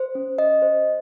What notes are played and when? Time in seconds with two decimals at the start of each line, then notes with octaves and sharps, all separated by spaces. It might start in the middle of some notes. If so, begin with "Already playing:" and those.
Already playing: C5
0.15 C#4
0.38 D#5
0.62 C5